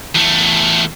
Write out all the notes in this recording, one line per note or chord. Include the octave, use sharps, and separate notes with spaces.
E2 A3